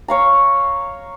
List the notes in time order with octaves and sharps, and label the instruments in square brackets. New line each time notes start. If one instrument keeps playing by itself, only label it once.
[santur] C#5 F5 A#5